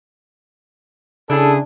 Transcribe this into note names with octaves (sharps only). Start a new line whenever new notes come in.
C#3 D4 E4 G#4 A4